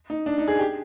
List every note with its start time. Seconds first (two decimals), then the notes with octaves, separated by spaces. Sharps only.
0.10 D#4
0.26 D4
0.38 D#4
0.48 G#4
0.59 G4